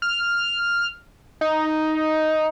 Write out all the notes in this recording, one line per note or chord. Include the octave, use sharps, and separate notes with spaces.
F6
D#4